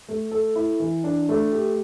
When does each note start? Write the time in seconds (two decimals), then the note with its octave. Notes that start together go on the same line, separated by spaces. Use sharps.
0.08 A3
0.31 A4
0.56 E4
0.80 E3
1.04 D4
1.29 A3
1.52 G4